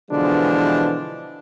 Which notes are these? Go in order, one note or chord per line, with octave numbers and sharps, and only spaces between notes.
B2 D3 E3 F3 G#3 D4